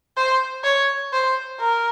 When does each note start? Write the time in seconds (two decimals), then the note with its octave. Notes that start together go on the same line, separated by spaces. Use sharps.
0.17 C5
0.64 C#5
1.13 C5
1.60 A#4